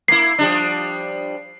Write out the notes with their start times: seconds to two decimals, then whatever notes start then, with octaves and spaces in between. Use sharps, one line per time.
0.08 A#3 E4 C7
0.39 F3 G3 D4